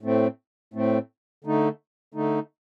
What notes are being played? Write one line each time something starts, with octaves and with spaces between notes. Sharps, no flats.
A2 A3 C4
A2 A3 C4
D3 A3 D#4
D3 A3 D#4